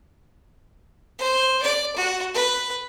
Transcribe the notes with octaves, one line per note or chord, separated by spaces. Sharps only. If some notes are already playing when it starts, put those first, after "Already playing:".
C5
D5
F#4
B4